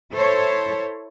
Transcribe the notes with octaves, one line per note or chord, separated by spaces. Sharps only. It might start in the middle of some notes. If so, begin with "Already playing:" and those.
E4 A4 C5 C#5